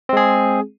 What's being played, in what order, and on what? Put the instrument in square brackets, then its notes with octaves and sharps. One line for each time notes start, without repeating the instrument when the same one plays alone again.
[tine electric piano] C4
G#3
G#4